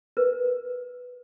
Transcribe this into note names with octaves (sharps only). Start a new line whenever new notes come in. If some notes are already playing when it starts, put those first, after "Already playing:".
A#4 B4